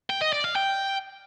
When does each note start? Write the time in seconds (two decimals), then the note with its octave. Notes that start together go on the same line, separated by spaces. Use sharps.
0.10 G5
0.21 D#5
0.33 D5
0.44 F5
0.56 G5